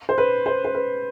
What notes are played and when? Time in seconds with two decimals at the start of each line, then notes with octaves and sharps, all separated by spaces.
0.09 C5
0.18 B4
0.46 C5
0.65 C5
0.75 B4